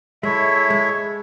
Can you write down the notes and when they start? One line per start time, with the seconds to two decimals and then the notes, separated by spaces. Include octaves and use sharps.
0.23 G#3 E4 A4 C#5 E5
0.70 G#3